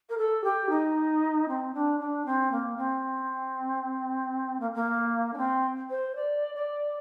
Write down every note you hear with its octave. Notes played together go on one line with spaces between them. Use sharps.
A#4
A4
G4
D#4
C4
D4
D4
C4
A#3
C4
A#3
A#3
D4
C4
C5
D5
D5